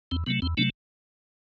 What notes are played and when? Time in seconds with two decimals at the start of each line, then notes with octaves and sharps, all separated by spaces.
0.11 E2 C4
0.27 C3 F#3 A3 B3
0.42 E2 C4
0.57 C3 F#3 A3 B3 D4